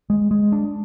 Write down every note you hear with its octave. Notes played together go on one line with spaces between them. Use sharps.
G#3
G#3
D4